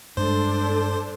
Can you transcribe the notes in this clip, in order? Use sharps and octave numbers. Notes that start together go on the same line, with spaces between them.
G2 G#3 D4 A4 C5